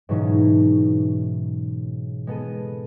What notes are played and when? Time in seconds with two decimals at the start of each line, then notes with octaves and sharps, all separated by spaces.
0.09 G#2 B2 E3 F#3 C#4 D#4
2.27 G#3 B3 A4 D#7